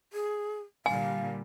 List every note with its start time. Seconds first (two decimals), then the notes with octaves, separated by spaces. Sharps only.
0.13 G#4
0.86 A#2 D3 G3 F5 G#5